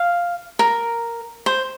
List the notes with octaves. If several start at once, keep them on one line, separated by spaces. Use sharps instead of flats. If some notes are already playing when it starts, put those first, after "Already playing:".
Already playing: F5
A#4
C5